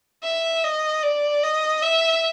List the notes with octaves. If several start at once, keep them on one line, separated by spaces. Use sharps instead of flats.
E5
D#5
D5
D#5
E5